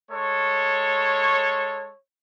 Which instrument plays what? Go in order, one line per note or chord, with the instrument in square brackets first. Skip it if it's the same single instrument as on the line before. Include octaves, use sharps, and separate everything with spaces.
[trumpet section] G#3 A4 C#5